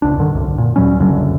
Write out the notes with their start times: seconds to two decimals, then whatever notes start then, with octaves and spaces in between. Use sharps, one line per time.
0.02 D1 C#2 D4
0.18 G2 D3 D#3
0.35 C2 F#2
0.58 A#2
0.76 D2 F#3 G3 C#4
0.99 F#1 C#2 F#2 D3